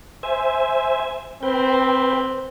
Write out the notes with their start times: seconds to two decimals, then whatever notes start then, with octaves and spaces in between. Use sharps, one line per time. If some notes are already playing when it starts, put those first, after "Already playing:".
0.23 C5 E5 G#5
1.43 C4 B4 G5